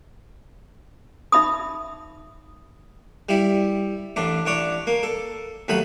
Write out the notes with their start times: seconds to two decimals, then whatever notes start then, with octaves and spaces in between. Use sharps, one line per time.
1.32 D#4 E5 B5 D#6
3.29 G3 E4
4.16 A1 A2 D4 D6
4.46 A1 D4 C#5 D6
4.87 A#3
5.03 A4
5.68 D#2 F#3 A3 B5 D#6